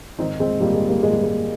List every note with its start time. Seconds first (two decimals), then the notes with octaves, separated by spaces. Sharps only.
0.18 G#2 D#3 C4 D#4
0.40 G#3 C4
0.60 G#2 D#3 G3 A#3
0.74 G#3
0.89 G3 A#3
1.03 G#2 D#3 G#3
1.13 G3
1.24 G#3